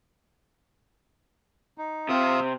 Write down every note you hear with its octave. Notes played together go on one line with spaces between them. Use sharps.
D#4
C3 C4 F4 E5 D#6